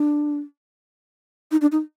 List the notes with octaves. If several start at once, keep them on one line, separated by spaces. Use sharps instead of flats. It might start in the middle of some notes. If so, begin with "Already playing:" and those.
Already playing: D4
D#4
D4
D#4